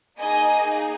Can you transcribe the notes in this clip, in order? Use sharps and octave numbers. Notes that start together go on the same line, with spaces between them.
A#3 D#4 G#4 D#5 G#5